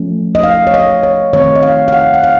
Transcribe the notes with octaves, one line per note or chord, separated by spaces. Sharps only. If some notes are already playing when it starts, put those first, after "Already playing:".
Already playing: F3 A3 C#4
D#5
F5
C#5
D#5
C#5
D#3 A3 C4 C#5
D#5
F5
F5
F#5
F#5
F5